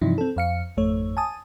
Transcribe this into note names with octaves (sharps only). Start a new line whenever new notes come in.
G2 C3 E3 F3 D#4 E4
C4 A4
F2 F5 C#7
G#1 F2 A3 C#5
G#5 A5 D#6